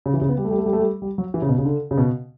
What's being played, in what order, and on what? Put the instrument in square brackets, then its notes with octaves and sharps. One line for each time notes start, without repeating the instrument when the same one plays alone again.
[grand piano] C#3
E3
C#3
B3
G3
A3
G3
A3
G3
A3
G3
G3
F#3
E3
C#3
B2
C#3
D3
C#3
B2